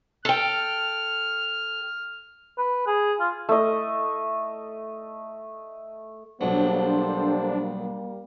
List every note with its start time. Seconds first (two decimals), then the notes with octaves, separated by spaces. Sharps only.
0.25 A4 G5 F6
2.58 B4
2.87 G#4
3.20 F4
3.49 A3 D#5
6.41 B1 F#3 G3 A#3 D4 A4 C5